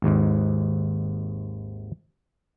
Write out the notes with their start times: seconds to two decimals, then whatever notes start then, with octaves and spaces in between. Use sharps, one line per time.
0.02 G#1 D#2 G#2